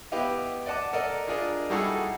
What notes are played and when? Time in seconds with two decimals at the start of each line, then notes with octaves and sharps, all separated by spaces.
0.12 B3 E4 G4 D#5 F5
0.66 D5 D#5 F#5 A5 D6
0.93 A4 A#4 D5 D#5
1.28 D4 F4 G#4 A#4 D5 D#5
1.70 G3 D#4 E4 F#4 G#4 A4